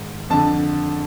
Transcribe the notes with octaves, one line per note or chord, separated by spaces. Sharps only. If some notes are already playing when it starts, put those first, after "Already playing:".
Already playing: G#2 D#3
F2 D3 A5